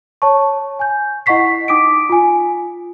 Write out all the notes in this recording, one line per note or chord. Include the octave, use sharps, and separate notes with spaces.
C#5 A5 C#6
G#5 G6
E4 D#5 F#5 C#6 B6 C7
D#4 G5 D6 D#6 B6 D7
F4 G#5